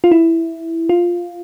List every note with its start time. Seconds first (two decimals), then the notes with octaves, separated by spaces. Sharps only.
0.04 F4
0.11 E4
0.89 F4